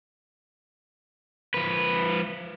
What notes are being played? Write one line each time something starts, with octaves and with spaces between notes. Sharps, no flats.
F3 B4